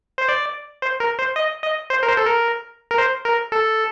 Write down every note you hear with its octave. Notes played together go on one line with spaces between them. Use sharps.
C5
D5
C5
A#4
C5
D#5
D#5
C5
A#4
C5
A4
A#4
A#4
C5
A#4
A4